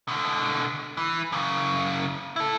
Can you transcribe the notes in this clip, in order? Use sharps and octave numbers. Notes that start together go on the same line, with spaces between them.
B2 D3
E3
F#2 C#3
E4 A4